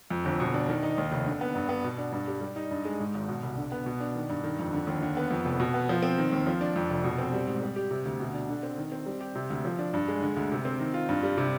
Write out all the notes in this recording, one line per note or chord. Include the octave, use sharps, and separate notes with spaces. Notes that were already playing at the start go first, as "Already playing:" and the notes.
F2
G1
B2
D4
D#3
D#4
D#2
F1
D3
B3
G2
B3
B2
D4
G2
G3
G3
D#4
G2
G#3
G#2
G#1
B2
C2
D3
B3
B2
D4
D#3
G2
D#3
F2
D3
D#2
D3
B3
F2
F1
B2
B3
F3
C4
D#3
D#2
F3
D4
F2
F1
B2
C4
G3
G#2
G3
G4
C3
D2
B2
D4
D3
C4
D#3
C4
G3
G4
C3
D2
F3
D4
G2
G#3
D3
D2
C3
C4
D#3
F4
G2
G3
C3